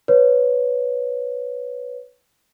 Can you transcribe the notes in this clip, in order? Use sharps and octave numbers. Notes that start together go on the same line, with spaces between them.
B4 C#5